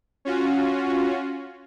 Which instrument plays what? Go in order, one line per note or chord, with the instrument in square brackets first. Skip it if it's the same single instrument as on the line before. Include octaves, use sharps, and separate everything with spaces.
[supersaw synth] C#4 F4 F#4